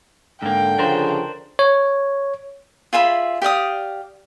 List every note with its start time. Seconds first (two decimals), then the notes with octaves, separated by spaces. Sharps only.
0.43 G#2 D3 A#3 G5
0.79 C#3 F3 D4 A#4 C5
1.59 C#5
2.93 F4 G#4 E5 B5
3.42 G4 D5 F5 D#6